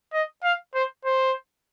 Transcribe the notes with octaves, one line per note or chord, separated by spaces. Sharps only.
D#5
F5
C5
C5